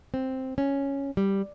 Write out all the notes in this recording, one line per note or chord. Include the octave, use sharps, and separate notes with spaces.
C4
C#4
G3